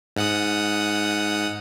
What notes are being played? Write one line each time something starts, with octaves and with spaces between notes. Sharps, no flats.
G#2 F#5 D#6